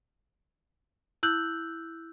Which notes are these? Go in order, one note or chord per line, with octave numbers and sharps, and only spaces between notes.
E4 E6 F#6 G6 F#7